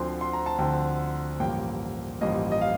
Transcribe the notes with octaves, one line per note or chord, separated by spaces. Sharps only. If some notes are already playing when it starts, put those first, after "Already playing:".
Already playing: D2 D3 F3 C4 C6
C6
A#5
A5
D2 D3 F3 C4 G5
A1 G2 F3 A#3 G5
A1 G2 F3 A#3 D#5
D#5
F5